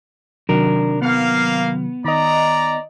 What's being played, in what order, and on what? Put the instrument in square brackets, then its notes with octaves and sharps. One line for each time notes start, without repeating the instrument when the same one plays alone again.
[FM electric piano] C3 D#3 F#3 [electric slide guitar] D4 A#4
[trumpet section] A#3 F5 [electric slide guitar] B3
[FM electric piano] D#3 D#5 [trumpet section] D5 A#5